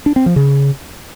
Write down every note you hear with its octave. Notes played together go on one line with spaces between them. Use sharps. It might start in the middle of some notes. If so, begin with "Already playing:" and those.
D4
C4
F3
C#3